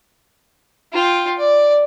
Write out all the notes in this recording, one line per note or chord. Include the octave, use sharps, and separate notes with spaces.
F4 G5
D5